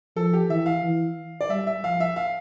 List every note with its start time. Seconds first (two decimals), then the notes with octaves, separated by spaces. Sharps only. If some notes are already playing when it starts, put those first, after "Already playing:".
0.16 F3 A4
0.33 G4
0.50 E3 E5
0.66 F5
0.84 E3
1.41 D5
1.50 G3 E5
1.67 E5
1.84 F3 F5
2.00 E5
2.16 F5